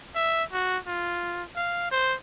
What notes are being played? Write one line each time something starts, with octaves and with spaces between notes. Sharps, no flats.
E5
F#4
F4
F5
C5